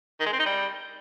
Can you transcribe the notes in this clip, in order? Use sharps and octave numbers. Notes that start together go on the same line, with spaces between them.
D#3
G#3
C4
D#4
G3